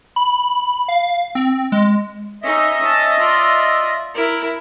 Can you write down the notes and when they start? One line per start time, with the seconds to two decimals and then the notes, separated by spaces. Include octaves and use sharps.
0.16 B5
0.88 F5
1.35 C4
1.72 G#3
2.43 C#4 D#4 D#5 E5
2.81 C#4 A5
3.19 F4 D5
4.14 E4 A#4